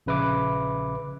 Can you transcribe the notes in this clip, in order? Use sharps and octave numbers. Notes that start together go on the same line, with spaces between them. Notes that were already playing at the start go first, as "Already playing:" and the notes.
A#1 C#3 B4 E5 D6